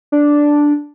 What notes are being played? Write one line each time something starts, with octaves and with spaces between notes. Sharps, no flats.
D4